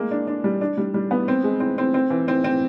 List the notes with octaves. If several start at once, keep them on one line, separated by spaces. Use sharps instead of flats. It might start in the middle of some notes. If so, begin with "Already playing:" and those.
Already playing: G#3 A#3
D4
D4
G3
D4
G3
G3
B3
C4
G#3
C4
C4
C4
E3
C4
C4